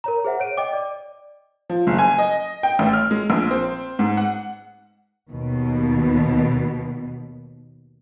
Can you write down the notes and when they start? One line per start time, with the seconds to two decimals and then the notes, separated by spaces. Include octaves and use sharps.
0.04 A#4 C#5 A#5
0.25 G#4 C5 E5 F#5
0.40 C#5 D7 D#7
0.57 D#5 G5 D6
0.73 D5
1.69 F3
1.87 F#1
1.98 G#5
2.18 D#5
2.63 G5
2.79 A1
2.93 F6
3.11 G#3
3.30 A#1
3.51 C4
3.99 G#2
4.17 F#5
5.29 D#2 B2